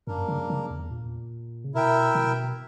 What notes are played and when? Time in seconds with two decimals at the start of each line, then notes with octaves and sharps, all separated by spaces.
0.07 F#2 A#3 D4 A#4
0.28 C#3
0.50 C#3
0.71 E2
0.91 A#2
1.64 C#3
1.74 B2 E4 A#4 E5 G5
2.15 B2